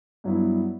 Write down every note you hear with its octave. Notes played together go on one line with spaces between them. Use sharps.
G2 F#3 B3 E4